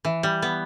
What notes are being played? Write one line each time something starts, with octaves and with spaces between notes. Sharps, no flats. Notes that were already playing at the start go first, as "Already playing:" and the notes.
E3
G3
B3